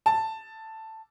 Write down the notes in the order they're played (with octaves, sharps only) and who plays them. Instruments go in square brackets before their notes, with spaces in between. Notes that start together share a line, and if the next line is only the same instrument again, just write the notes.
[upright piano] A5